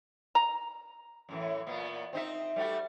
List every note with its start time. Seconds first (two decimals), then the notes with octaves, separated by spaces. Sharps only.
0.35 A#5
1.29 F#2 A2 E3
1.67 A#2 B3
2.13 C4 D#4 E5
2.56 G3 A3 F#4